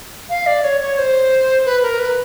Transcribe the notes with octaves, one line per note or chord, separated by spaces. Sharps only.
F5
D5
C#5
C#5
C5
B4
A#4
B4